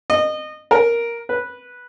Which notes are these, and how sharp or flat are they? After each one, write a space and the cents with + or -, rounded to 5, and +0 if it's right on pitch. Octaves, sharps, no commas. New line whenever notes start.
D#5 -25
A#4 +5
B4 -5